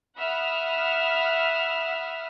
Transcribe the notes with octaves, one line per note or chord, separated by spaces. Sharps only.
E5 F#5 B5 D#6 F6